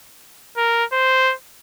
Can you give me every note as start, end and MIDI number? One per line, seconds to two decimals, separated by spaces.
0.57 0.84 70
0.92 1.34 72